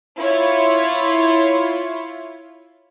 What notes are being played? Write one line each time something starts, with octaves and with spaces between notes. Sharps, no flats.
E4 F4 C#5